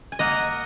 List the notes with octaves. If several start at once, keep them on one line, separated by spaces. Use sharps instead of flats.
G#5
A#3 D#5 F#5